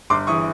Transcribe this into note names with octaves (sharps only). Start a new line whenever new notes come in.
G1 C6 D6
E3 C#6 D#6